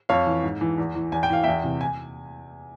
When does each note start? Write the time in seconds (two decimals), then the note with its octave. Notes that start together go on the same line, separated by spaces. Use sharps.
0.09 F2 C#5 F5
0.27 E3
0.43 G#2
0.61 E3
0.78 E2
0.95 E3
1.12 E2 G#5
1.23 G5
1.30 E3 F5
1.44 E2 E5 G5
1.63 C3 E3
1.81 G#5